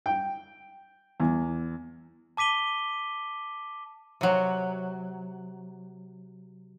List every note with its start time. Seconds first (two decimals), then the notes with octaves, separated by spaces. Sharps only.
0.06 G5
1.20 E2
2.37 A5 D6 B6 D#7 G7
4.21 C3 F#3